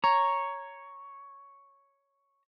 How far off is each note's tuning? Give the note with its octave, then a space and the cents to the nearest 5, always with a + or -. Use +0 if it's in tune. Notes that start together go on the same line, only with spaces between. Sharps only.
C#5 +0 A#5 +0